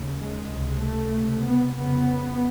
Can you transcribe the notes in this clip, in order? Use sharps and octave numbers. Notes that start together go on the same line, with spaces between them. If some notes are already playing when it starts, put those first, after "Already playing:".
Already playing: D#2 C#3
G#3
C#2 C3
A3
C#2 C3
B3
F2 C#3 B3